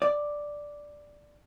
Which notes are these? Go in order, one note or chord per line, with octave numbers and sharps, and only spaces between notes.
D5